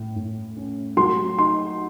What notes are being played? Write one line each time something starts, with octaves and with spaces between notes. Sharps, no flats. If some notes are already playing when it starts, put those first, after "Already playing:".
Already playing: A2
A2
C#4
F#3 C6
D#4 C6